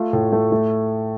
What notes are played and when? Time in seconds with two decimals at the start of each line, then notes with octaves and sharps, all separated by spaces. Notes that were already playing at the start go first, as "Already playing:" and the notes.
Already playing: A3 F4
0.13 A2
0.32 A3
0.52 A3